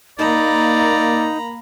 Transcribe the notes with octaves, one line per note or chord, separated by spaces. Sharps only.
A#3 D#4 D5 A#5 B5